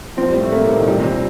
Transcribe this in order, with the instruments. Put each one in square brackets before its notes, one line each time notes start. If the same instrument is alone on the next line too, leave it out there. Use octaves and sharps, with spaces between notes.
[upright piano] F3 [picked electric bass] C4
[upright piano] G3
[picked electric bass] A2
[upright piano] A3
[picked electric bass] A3 [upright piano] A#3
[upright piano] C3
[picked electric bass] A2
[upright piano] D#3
[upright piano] A#2 [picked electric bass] G3
[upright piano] C3
[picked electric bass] D#2
[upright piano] A#2